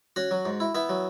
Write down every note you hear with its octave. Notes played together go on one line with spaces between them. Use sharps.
C#4 F#4 F#5
F#3
G#2
E4
B3 E4 E5
F#3